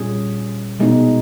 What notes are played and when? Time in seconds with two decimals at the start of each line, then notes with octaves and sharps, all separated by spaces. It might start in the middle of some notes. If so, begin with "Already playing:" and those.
Already playing: A#2 G3 C#4 G#4
0.80 B2 G#3 D#4